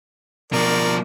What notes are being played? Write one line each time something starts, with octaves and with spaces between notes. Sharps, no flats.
B2 F3 A#4 D5